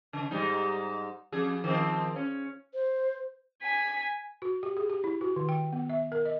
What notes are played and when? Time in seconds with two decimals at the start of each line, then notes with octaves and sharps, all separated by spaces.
0.13 C#3
0.31 G#2 G3 D#4
1.32 F2 G#4
1.64 D#3 F3 C4
2.16 C#4
2.74 C5
3.62 G#5 B6
4.42 F#4
4.63 G4
4.77 G#4
4.90 G4
5.04 E4
5.21 F#4
5.36 D#3
5.49 G5
5.73 B3
5.90 E5
6.12 A#4
6.25 D#5